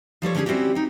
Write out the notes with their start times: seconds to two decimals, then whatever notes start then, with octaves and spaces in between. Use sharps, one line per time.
0.22 F3 G3 A4 C#5
0.35 D3 B3 C#4 G4 G#4
0.46 G3 C4 C#4 E4 F#4 G4
0.75 D#4 G5